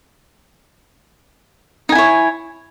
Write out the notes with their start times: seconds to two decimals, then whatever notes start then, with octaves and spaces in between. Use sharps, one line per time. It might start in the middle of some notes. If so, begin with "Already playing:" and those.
1.89 D#4
1.92 G#5
1.95 E4
1.98 C#5